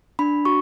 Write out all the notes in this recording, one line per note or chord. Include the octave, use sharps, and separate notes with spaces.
D4 B5
F#4 C#6